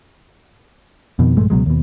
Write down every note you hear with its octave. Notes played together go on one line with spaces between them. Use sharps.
F2 B2 D#3
A#1 G2 G#3 A3
C#2 B2 F#3 G#3
D#2 B2